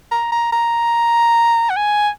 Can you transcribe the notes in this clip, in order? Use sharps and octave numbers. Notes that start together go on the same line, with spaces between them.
A#5
A#5
A#5
F#5
G#5